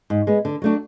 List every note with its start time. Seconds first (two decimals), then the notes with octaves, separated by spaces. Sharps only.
0.10 G#2
0.27 G#3 B3
0.45 D3
0.62 F#3 A3 D4 F#4